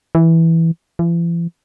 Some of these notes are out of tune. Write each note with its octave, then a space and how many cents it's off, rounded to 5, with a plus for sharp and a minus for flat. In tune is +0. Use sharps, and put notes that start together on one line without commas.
E3 -5
E3 +45